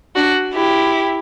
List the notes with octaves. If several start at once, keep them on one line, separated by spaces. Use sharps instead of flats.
D4 F#4
E4 G4